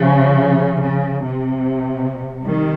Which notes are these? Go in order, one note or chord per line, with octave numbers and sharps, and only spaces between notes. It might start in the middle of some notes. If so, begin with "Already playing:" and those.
Already playing: C#3 F3
C#3
C3
D#3 G3